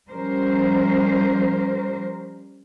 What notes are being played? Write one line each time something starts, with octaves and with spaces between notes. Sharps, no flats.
F3 G3 C#4 A#4 C5